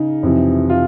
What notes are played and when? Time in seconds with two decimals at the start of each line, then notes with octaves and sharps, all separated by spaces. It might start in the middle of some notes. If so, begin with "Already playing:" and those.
Already playing: C#3 D#4
0.23 F2 C3 E3
0.69 F4